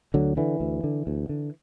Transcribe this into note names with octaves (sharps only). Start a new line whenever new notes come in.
D2 D3 F#3
D3 E3
D2
D3
D2
D3